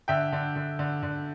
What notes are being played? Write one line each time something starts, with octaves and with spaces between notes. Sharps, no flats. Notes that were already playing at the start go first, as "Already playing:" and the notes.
D3 E5 G5
D3
D3
D3
D3